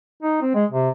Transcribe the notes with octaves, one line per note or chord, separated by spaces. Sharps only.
D#4
C4
G#3
C3